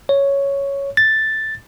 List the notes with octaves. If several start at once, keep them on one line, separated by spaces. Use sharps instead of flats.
C#5
A6